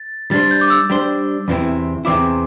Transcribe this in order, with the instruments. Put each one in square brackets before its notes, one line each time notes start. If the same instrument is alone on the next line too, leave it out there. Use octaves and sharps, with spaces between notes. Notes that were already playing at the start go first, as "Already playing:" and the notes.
Already playing: [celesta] A6
[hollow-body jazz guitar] G3 D4 C5 [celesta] A6
[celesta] G6
D6
E6
[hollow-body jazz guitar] G3 D4 C5
E2 C3 E3 C4 E4
[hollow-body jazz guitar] E2 C3 E3 C4 E4 [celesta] D6